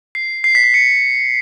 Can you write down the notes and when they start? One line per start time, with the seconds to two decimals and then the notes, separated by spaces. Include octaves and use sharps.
0.15 C7
0.44 C7
0.55 B6
0.64 C7
0.74 C#7